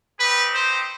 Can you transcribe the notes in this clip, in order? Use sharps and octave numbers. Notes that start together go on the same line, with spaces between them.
C4 D#4 G4 B4
C5